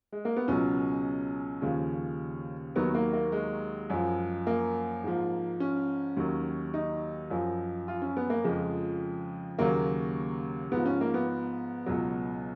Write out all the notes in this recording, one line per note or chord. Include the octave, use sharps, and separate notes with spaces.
G#3
A#3
B3
C#2 B2 F#3 C#4
D#2 C#3 F3
D#2 D#3 F#3 B3
A#3
A#3
G#3
F#2 F3
A#3
G#2 F3
C#4
D#2 D#3 F#3
D#4
F#2 F3
F4
C#4
B3
A#3
F2 C#3 F3 G#3
D#2 C#3 F#3 A#3
G#2 F3 B3
C#4
A#3
B3
C#2 B2 F#3